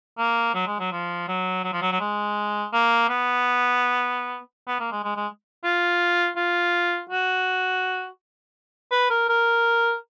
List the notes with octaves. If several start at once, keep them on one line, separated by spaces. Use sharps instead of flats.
A#3
F#3
G#3
F#3
F3
F#3
F#3
F3
F#3
F#3
G#3
A#3
B3
B3
A#3
G#3
G#3
G#3
F4
F4
F#4
B4
A#4
A#4